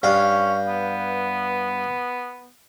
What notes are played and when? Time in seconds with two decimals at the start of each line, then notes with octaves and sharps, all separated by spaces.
0.03 G2 C#4 F5
0.68 B3